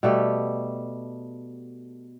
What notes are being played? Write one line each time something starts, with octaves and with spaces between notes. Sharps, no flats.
B2 G3 A3 G4